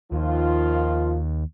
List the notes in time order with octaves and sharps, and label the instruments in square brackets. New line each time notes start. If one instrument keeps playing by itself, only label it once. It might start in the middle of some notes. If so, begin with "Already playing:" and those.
[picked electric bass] D#2 [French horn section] D#3 F3 F4